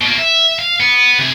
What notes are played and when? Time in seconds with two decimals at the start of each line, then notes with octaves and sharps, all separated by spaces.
0.01 B2 A#3
0.19 E5
0.59 F5
0.80 B3
1.19 C3 G#4